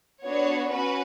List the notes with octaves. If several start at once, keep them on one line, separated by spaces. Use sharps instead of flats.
B3 D4 F#4 C#5
C#4 F#4 B4